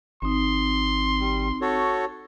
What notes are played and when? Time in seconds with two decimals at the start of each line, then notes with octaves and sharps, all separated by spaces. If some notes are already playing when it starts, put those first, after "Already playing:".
0.22 G#1 C4 D#4 C6
1.19 G3
1.61 F#4 A4 C#5